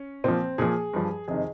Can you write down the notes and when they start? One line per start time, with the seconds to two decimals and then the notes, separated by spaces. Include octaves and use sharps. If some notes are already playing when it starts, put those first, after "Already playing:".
Already playing: C#4
0.24 A#2 F3 C4
0.58 A#2 F3 G#4
0.93 G2 F3
1.28 F2 C3 D#3 G#4